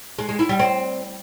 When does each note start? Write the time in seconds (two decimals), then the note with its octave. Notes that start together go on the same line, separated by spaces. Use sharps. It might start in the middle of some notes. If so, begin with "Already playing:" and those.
0.18 G#3
0.29 G#3
0.39 E4
0.49 G3
0.59 C4